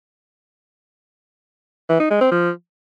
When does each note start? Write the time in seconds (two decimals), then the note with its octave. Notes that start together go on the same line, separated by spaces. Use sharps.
1.90 E3
2.00 D#4
2.11 G#3
2.21 C4
2.32 F3